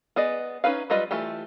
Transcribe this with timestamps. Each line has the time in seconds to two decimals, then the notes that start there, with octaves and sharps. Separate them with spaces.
0.16 B3 G#4 D5 D#5
0.64 C#4 D#4 A#4 B4 F5
0.90 F#3 G3 F4 B4 D#5
1.11 E3 A3 F4 G4